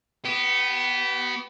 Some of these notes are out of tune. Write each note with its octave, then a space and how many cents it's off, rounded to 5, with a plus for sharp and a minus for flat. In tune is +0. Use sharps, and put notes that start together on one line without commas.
B3 +0 G4 -35